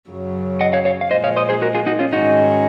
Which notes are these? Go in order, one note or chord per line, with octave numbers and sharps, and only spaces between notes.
F#2 C#3 F#3
D#5 F#5
C#5 F5
C#5 F5
F5
A#2 F3 G#3 C5 D#5
C#5 F5
C5 D#5
G#4 C5
F#4 A#4
F4 G#4
D#4 F#4
C#4 F4
G#2 D#3 G#3 C#4 D#4 F#4